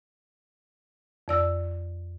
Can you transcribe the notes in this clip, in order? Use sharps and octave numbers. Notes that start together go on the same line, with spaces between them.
F2 D5 E6